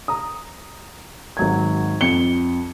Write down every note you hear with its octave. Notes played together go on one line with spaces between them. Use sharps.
A#5 D#6
G#1 F#3 G#6
F2 C#7 G7